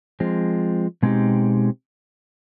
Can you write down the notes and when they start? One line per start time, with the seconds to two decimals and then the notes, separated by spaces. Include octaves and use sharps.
0.20 F3 G#3 C4
1.03 B2 G#3 C4 D#4 G4